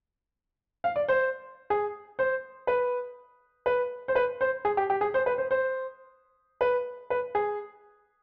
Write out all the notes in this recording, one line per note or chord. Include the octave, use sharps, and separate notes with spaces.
F5
D5
C5
G#4
C5
B4
B4
C5
B4
C5
G#4
G4
G4
G#4
C5
B4
C5
C5
B4
B4
G#4